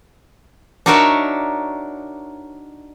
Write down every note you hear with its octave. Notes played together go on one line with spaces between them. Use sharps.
D4 D#4 F#4 A#4 C#5 E5